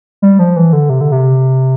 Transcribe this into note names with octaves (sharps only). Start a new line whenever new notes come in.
G3
F3
E3
D3
C3
D3
C3